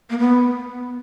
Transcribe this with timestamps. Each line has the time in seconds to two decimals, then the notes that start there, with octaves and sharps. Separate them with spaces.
0.10 A#3
0.19 B3